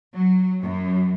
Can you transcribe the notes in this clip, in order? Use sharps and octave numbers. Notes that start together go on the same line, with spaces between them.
F#3
F#2